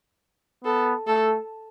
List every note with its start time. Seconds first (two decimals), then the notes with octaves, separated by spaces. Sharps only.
0.65 B3 A4
1.07 A3 A4